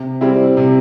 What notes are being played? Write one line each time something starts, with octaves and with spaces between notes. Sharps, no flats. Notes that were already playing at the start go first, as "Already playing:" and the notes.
Already playing: C3
G3 C4 E4
C3